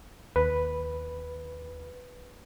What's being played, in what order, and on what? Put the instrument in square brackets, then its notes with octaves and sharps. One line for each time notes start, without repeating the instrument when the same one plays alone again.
[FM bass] D#2 [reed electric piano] B4